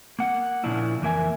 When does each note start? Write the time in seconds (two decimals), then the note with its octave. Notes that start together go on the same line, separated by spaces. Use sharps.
0.19 A#3 F#5
0.64 A#2 C#3 F3 D4 E4
1.02 F2 E3 A#3 A#4 E5 G#5